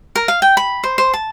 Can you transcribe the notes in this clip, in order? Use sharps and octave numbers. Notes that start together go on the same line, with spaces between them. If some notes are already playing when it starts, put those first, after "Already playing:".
A#4
F5
G5
B5
C5
C5
A5